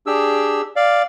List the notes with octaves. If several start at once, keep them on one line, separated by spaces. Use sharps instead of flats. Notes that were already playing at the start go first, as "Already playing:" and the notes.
D4 G4 G#4 E6
D5 F5